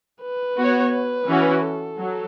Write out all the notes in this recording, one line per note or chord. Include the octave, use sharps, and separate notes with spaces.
B4
B3 F#4 C#5
B4
E3 C#4 F#4
A4
F#3